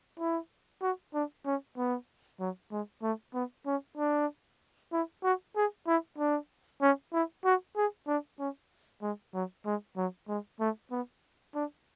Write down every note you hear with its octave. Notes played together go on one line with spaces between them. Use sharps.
E4
F#4
D4
C#4
B3
F#3
G#3
A3
B3
C#4
D4
E4
F#4
G#4
E4
D4
C#4
E4
F#4
G#4
D4
C#4
G#3
F#3
G#3
F#3
G#3
A3
B3
D4